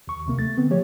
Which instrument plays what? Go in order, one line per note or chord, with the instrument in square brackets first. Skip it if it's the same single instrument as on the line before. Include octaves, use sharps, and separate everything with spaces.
[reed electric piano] D#2 C#6
D2 C3 A#3
A3 A6
D3 B3 C4
F3 A3 G4 C#5